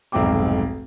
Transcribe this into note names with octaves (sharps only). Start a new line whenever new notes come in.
F1 B1 G#2 C4 G5 D6